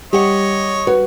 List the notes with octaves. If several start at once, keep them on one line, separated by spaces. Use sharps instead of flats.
G3 G4 C#5 D#5 F#5
F#4 B4